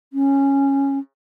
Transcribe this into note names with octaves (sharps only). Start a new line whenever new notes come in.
C#4